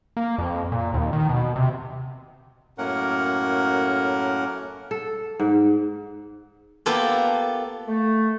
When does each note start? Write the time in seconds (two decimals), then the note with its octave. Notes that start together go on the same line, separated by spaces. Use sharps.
0.17 A#3
0.38 F2
0.72 A#2
0.94 D#2
1.13 D#3
1.29 B2
1.56 C3
2.78 F#2 A2 A#3 C#4 A#4 F#5
4.91 A4
5.40 G#2
6.86 A#3 B3 F4 G4 A4
7.88 A3